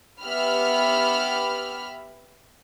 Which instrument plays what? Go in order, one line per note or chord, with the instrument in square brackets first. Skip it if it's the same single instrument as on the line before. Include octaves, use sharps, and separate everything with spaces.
[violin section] B3 G4 E5 B5 F6